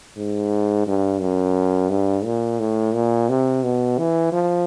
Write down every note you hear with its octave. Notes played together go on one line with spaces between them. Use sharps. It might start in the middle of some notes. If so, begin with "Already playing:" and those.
G#2
G2
F#2
G2
A#2
A2
A#2
C3
B2
E3
F3